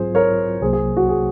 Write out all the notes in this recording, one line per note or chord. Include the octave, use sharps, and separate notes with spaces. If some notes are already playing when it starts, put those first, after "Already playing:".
Already playing: G#2 F#3 C4 F4 G#4 C5
A#4 C#5
C2 C3 F#3 A#3 G#4 C5
G#4
F#4
G#4